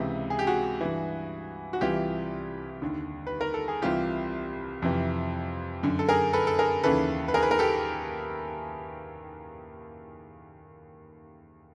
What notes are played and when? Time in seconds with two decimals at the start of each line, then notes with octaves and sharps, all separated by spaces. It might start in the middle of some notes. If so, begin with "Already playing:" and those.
Already playing: C#2 C3 E3
0.30 G#4
0.39 G4
0.47 F#4 G#4
0.81 G2 E3
1.73 F#4
1.81 C2 C3 E3 F4 G4
2.82 D#2 D3
3.27 B4
3.41 A#4
3.54 A4
3.68 G#4
3.82 C2 C3 E3 F4 G4
4.82 F2 C3 E3
5.83 F#2 D3
5.99 A4
6.09 G#4 A#4
6.33 A4 B4
6.47 A4
6.59 G#4 A#4
6.83 D#2 C#3 E3 A4 B4
7.28 B4
7.34 G#4 A#4
7.43 B4
7.51 A#4
7.59 G4 A4